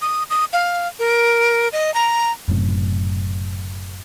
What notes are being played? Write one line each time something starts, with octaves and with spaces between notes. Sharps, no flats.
D#6
D#6
F5
A#4
D#5
A#5
F#1 F#2 A2 C3